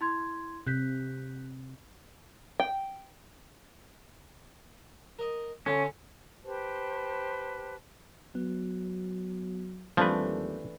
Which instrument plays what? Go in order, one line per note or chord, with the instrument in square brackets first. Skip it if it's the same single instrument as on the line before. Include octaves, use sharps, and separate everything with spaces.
[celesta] E4 C6 G#6
[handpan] C3 [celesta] F#6 G6 B6
[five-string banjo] G5
[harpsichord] A#4 D#5
[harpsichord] D3 F4 F5 [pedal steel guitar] C#4
[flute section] G4 B4 C5 A5
[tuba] F#3 [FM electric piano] B3
[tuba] D#2 [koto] E3 A3 D4 [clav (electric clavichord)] F3 B4 [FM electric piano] G3 C4